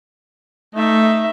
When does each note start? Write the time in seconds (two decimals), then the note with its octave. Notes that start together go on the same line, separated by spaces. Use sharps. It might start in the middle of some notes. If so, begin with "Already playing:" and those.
0.75 A3 D#4 E5